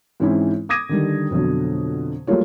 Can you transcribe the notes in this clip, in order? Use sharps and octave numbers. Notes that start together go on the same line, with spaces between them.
G#2 E3 C4 C#4 D#4 E4
D6 D#6 G#6 A#6 D#7
D3 D#3 G3
F2 B2 D3 F#3
F#3 G3 A3 A#3 F4 C#5